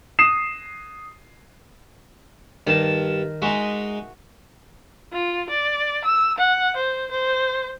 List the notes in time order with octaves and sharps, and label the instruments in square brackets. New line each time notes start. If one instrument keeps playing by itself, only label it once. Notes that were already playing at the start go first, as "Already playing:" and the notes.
[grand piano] D#6 C7 E7
[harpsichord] G2 A5 [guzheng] D#3
[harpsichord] G#3 D#4 [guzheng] F#4 E5
[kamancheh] F4
D5
E6
F#5
C5
C5